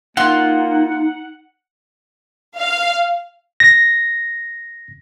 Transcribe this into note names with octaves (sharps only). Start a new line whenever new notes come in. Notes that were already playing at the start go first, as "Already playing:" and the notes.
A#3 D#4 F4 F#5
F5
A#6